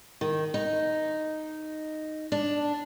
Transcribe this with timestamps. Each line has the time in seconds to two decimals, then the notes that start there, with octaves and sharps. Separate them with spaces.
0.21 D#3
0.54 D#4
2.32 D4